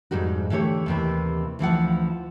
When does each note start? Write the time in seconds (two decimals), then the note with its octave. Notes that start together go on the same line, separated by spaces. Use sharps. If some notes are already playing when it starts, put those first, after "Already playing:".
0.11 F2 G#2 G3 D#4 F#4
0.50 D3 E3 A3 G4 C#5
0.86 D#2 C3 E3
1.59 D2 E3 F3 F#5